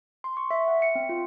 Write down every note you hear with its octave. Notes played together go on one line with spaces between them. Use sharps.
C6
C#6
E5
F#5
C#7
C4
F4